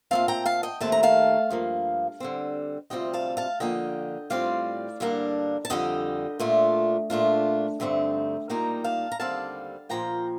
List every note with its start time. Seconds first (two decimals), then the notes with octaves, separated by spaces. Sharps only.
0.11 A#2 A3 C4 F5 A5
0.28 G5 A#5
0.46 F5 A5
0.63 D#5 G5
0.80 D#2 D#3 A3 C4 A5
0.92 A#5
1.03 F5 A5
1.51 G2 F3 A#3
2.20 D3 G3 C4
2.90 D2 C3 G3 C4 F4 D#5 G5
3.14 F5 A5
3.37 F5 A5
3.60 D3 F3 A#3 D#5 G5
4.30 A2 G3 C4 F4 D5 F5
5.00 G2 D3 G3 A#3 D4
5.65 A5
5.70 F2 D3 G3 D#5 G5
6.39 A#2 A3 D4 F4
7.10 A#2 A3 D4 F4
7.80 G2 D3 A3 C4 D#4
8.49 A#2 G3 A#3 D#4 G5 A#5
8.84 F5 A5
9.12 A#5
9.20 D#2 D3 G3 C4 F5 A5
9.89 A#2 F3 A#3 G5 A#5